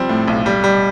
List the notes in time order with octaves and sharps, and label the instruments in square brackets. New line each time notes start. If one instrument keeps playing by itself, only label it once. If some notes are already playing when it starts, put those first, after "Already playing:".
Already playing: [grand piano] F3 G3 C4
A2
B1
G3
G3